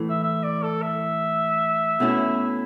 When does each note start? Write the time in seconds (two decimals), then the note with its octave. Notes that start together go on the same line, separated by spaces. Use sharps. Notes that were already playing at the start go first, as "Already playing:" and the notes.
Already playing: A2 E3 A3
0.09 E5
0.23 E5
0.44 D5
0.63 A4
0.82 E5
2.00 B2 A3 C#4 E4